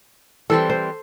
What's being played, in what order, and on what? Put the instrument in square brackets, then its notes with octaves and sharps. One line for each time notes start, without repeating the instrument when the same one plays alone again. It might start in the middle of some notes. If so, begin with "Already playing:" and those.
[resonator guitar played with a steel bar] E3 G3 C4 [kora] A4
[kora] C5